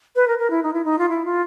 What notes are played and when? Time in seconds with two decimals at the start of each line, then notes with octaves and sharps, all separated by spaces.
0.16 B4
0.28 A#4
0.39 A#4
0.50 E4
0.63 D#4
0.73 E4
0.85 D#4
0.99 F4
1.09 E4
1.25 F4